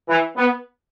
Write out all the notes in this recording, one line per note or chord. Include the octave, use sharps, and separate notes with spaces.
E3
B3